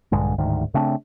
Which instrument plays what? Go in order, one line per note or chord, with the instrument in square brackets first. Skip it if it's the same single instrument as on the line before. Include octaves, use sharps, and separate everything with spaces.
[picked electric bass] A#1 G2 D3 G#3
D1 D2 G#2 D#3
C#3 A3 C4 D4